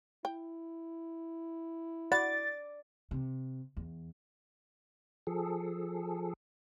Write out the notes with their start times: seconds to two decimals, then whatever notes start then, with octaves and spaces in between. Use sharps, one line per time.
0.25 E4 G5
2.12 F#4 D5 F#5 B5 A6
3.11 C3
3.77 E2
5.27 F3 G#4 A4